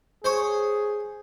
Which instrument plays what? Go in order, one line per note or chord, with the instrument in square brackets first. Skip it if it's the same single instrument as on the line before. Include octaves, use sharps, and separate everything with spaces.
[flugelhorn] G#4 [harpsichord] C5 C#5